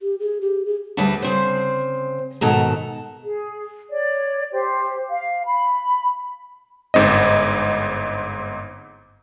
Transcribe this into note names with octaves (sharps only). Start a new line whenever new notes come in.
G4
G#4
G4
G#4
D2 G3 B4 E5 A5
C#3 C4 C5
G#2 B2 D#3 A4 A5 A#5
G#4
C#5 D5
G4 C5
F5
B5
G1 G#2 C4 D#5